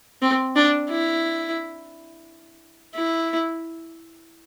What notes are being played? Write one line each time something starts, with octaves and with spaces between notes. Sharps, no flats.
C4
D4
E4
E4